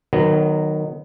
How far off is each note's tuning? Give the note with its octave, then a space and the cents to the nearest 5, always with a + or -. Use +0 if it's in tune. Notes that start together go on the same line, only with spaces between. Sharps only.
D#3 -20 F#3 +0 B3 +10